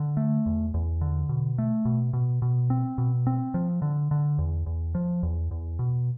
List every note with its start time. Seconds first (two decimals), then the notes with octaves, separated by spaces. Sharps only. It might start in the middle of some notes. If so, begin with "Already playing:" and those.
Already playing: D3
0.17 A3
0.46 E2
0.74 E2
1.01 D3
1.29 B2
1.58 A3
1.85 B2
2.13 B2
2.42 B2
2.70 C4
2.98 B2
3.27 C4
3.54 F3
3.82 D3
4.11 D3
4.38 E2
4.66 E2
4.95 F3
5.23 E2
5.51 E2
5.79 B2